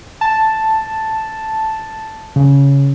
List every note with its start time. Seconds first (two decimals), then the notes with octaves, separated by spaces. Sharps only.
0.21 A5
2.36 C#3